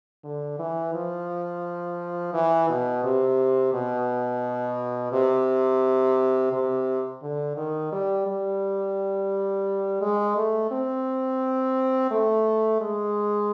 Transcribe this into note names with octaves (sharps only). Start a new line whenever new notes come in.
D3
E3
F3
E3
B2
C3
B2
C3
C3
D3
D#3
G3
G3
G#3
A3
C4
A3
G#3